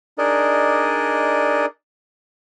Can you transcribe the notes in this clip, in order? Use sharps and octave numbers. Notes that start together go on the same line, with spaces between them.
D4 D#4 G#4 A#4 D5 D#5